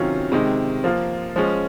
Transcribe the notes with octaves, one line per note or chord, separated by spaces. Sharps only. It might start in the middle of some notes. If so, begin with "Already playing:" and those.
Already playing: C3 D#3 F#3 C#4 F4
C3 D#3 G#3
F3 A#3 F4
F3 G#3 C#4